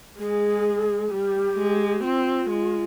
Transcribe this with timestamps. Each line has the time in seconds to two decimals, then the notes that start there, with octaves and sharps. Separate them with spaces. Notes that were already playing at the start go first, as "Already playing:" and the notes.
0.19 G#3 G#4
1.11 G3 G4
1.58 G#3
2.03 C4 F4
2.50 G#3